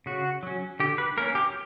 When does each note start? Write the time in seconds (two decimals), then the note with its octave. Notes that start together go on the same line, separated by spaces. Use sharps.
0.06 C#3 F#4
0.43 F#3 C#4
0.80 D3 G4
0.98 B4
1.17 A#3 C#4 A#4
1.35 G4